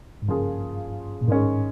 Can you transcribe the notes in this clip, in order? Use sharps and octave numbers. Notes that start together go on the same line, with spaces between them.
G#2
G2 C#3 F3 A#3 F4 G#4
A#2
G#2 D#3 G#3 C#4